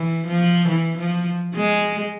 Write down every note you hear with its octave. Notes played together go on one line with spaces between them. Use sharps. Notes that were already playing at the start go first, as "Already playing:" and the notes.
Already playing: E3
F3
E3
F3
G#3